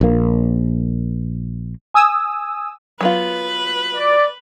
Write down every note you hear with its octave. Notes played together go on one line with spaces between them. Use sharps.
A#1 A#3
G#5 D#6 E6
F#3 B3 F4 B4
D5